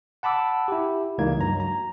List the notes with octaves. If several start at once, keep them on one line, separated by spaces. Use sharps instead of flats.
F#5 A5 B5 D6 E6
E4 G4
C#2 E3 A#3 D#4 G#6
G2 F#3 A#5
A#5